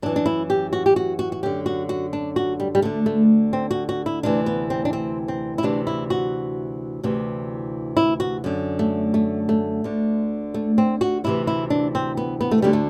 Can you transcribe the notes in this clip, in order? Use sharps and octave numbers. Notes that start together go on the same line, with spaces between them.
F#2 E3 D4
D4
E4
G4
F#4
G4
F#4
F#4
F#4
F#2 D3 G4
F#4
F#4
D4
F#4
G3
G3
D2 D3 A3
A3
C4
F#4
F#4
E4
D2 C3 E3 D4
B3
C4
D4
C4
C4
E4
D2 C3 E3 D4
E4
F#4
D2 C3 E3
E4
F#4
F#2 D3
A3
A3
A3
D2 D3
A3
C4
F#4
D2 C3 E3 E4
E4
D4
C4
B3
B3
A3
D2 D3 G3
A3